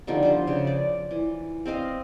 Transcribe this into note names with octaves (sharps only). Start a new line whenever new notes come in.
D3 D#3 F3 G3
F3 C5
C#3
D5
E3
C4 C5 D#5 F5